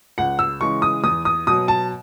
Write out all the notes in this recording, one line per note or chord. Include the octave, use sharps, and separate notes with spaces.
C#2 F#5
E6
C#3 E3 G#3 C#6
D#6
E2 D#6
D#6
B2 F#3 D#6
A5